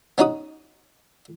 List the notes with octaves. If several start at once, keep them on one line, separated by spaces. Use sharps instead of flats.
B3 C#4 D#4 F#4 D#6